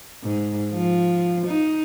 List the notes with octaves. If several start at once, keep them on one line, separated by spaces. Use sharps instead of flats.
G#2
F3
D#4